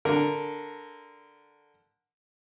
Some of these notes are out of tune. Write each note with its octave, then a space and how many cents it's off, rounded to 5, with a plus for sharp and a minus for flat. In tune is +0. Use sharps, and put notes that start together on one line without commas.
D3 +0 A#4 +0